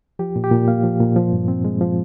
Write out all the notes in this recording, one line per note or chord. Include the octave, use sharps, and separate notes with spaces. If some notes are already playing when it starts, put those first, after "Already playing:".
F3 G4
A#2
G4
A#2
A#3 F5
F3
A#2
F3
G2
C4
G#3
F3